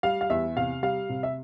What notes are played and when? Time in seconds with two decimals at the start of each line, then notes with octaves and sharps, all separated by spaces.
0.03 G3 F5
0.21 F5
0.30 E2 E5
0.56 C3 F5
0.83 G3 F5
1.09 C3
1.23 E5